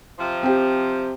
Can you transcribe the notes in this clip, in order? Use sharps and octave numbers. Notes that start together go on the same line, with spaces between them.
C3 F3
C4 G4